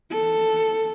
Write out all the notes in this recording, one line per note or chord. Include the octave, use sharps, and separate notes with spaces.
A4